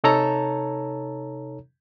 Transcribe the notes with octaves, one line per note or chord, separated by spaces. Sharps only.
C3 D#4 A4 C#5 A5 A#5